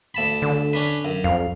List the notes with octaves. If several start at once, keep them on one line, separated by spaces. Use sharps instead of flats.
D2 A5 B5
D3
C#4 D4 B4
F#2
F2 F5